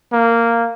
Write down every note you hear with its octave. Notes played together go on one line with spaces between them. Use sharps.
A#3